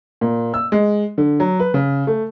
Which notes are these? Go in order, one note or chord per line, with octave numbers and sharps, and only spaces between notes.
A#2
E6
G#3
D3
F#3
B4
C#3
A3